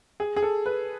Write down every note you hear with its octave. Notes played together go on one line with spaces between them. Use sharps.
G#4
G#4
A4
B4